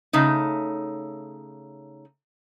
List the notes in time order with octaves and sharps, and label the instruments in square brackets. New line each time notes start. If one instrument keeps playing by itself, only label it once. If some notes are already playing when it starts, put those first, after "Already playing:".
[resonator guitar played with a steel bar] C#3 A3 D#4